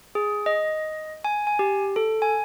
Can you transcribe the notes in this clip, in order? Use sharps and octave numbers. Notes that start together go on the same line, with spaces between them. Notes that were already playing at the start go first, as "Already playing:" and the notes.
G#4
D#5
G#5
G#5
G4
A4
G#5